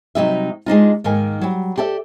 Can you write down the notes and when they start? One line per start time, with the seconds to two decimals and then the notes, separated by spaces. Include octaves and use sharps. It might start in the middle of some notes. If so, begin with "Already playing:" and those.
0.15 C3 F#3 G3 D#4 G4 E5
0.66 G#3 D4 D#4 F4
1.04 G#2 D#3 A#3 G#5
1.41 F#3 G3
1.78 G4 A4 D5 E5